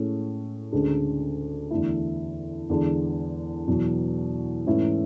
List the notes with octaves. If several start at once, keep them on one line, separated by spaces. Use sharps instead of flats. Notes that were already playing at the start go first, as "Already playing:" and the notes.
Already playing: A2 G#3 C#4
D2 C#3 G#3 D4
E2 D3 A3 E4
E2 D3 G#3
E2 B2 F#3
G#2 E3 A3 C#4 E4